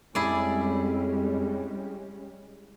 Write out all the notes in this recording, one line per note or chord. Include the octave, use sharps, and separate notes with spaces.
F2 G3 G#3 C#4 E4 G#4 D5